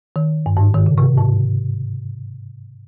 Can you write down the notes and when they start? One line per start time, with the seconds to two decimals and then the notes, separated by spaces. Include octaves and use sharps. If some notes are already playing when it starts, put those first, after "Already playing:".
0.16 D#3
0.46 G2
0.57 G#2
0.74 D#3
0.86 C#3
0.98 C3
1.18 G#2